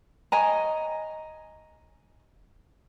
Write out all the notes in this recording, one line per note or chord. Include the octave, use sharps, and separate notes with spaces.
C#5 D#5 G#5 A#5